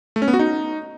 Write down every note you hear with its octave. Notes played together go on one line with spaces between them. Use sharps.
A3
C#4
B3
F#4
D#4